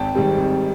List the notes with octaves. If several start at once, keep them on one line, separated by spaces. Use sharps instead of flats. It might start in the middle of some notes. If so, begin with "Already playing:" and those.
Already playing: G#1 G5 A5
G#2 D#3 G3 C4
G#1